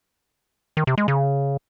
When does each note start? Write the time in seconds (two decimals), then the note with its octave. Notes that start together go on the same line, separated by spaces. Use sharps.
0.77 D#3
0.87 C3
0.98 G#3
1.08 C#3